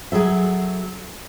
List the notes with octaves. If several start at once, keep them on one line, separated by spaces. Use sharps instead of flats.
F#3 G#4 A4 E5